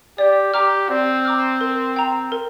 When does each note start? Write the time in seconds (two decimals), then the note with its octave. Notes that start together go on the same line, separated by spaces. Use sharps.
0.18 G4 D5
0.54 G4 A#5 D6 F6
0.89 C4 D5
1.25 A#5 D6 F6
1.61 A#4
1.96 G5 A#5
2.32 A#4